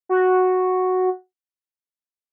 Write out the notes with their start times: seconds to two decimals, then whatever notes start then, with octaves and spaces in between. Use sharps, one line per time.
0.09 F#4